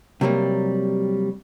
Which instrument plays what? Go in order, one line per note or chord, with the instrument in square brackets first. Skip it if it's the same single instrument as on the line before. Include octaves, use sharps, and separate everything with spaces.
[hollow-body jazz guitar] C3 F#3 G3 A#3